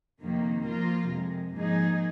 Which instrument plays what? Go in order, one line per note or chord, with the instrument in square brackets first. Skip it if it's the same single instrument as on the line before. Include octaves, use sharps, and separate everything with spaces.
[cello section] F2 C3 D#3 A#3
F3 A#3 F4 A#4
F2 C3 G#3
G#2 F3 A#3 D#4 G#4